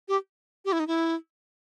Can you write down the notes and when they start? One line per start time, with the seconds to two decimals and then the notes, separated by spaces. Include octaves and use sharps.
0.08 G4
0.65 G4
0.72 E4
0.80 D#4
0.87 E4